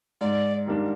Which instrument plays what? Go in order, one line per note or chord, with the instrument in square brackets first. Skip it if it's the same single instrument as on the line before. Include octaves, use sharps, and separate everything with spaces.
[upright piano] G#2 [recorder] D5
[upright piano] D#3 G3 A#3 D4